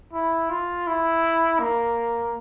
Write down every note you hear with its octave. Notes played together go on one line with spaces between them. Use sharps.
E4
F4
E4
A#3